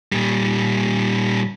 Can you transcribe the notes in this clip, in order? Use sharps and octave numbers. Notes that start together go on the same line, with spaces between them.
A#2 G3